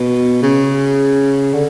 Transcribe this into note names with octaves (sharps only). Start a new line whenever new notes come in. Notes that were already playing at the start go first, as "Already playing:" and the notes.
Already playing: B2
C#3
D3